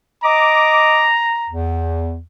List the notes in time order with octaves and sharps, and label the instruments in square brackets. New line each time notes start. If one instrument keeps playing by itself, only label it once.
[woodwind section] D#5 D6 [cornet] A#5
[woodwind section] E2